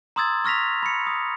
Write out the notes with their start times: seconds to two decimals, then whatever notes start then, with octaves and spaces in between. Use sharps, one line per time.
0.16 A#5 C6 D#6 E6 G#6 A6
0.45 C#6 F6 A#6 B6 F7
0.83 B5 C#7
1.07 D#6